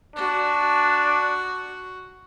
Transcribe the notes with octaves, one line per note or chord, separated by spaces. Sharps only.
D4 F#4